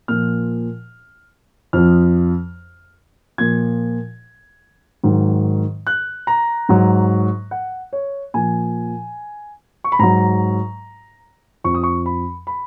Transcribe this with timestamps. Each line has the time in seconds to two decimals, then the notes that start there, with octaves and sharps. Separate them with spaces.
0.08 A#2 F3 F6
1.73 F2 F3 F6
3.38 A#2 F3 G#6
5.04 G#2 D#3 F#3
5.87 F#6
6.27 A#5
6.69 G#2 F#3
7.51 F#5
7.93 C#5
8.34 A#2 F3 G#5
9.84 C#6
9.92 B5
9.99 G#2 F#3 A#5
11.64 F2 F3 C#6
11.74 D#6
11.83 C#6
12.06 B5
12.47 B5